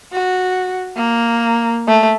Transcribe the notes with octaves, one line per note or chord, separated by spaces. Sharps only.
F#4
A#3
A3